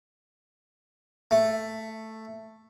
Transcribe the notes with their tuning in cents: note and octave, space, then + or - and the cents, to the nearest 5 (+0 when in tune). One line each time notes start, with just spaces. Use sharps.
A3 +5